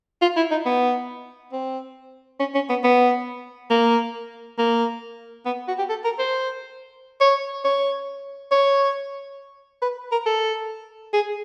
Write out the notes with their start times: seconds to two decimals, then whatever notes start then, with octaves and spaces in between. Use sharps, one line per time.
0.22 F4
0.37 E4
0.51 D#4
0.65 B3
1.53 C4
2.40 C#4
2.54 C#4
2.70 B3
2.84 B3
3.71 A#3
4.58 A#3
5.46 B3
5.68 F#4
5.78 G4
5.89 A4
6.04 A#4
6.19 C5
7.21 C#5
7.64 C#5
8.51 C#5
9.82 B4
10.12 A#4
10.26 A4
11.13 G#4